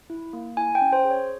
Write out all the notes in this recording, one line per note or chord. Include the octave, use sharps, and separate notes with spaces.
E4
A#3
E4 G#5
G5
C#4
C5
G#4
C#5